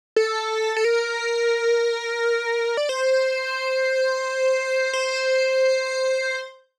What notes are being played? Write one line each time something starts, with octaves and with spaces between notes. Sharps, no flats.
A4
A4
A#4
D5
C5
C5